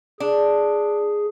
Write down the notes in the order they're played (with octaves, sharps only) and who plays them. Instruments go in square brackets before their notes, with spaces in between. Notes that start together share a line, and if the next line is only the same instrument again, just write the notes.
[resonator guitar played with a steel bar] D4 [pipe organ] G#4